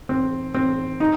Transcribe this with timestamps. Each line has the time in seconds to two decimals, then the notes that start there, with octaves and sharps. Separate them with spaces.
0.09 C4
0.55 C4
1.00 D#4